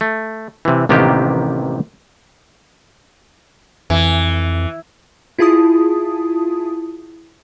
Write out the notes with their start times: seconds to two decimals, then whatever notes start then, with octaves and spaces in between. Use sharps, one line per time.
0.01 A3
0.65 C3 E3
0.89 A1 C3 D#3 A#3 B3 G4
3.90 F2 E3
5.38 E4 F4 G#4 A5 D#6